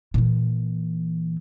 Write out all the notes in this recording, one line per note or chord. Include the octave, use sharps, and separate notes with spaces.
A#2 E3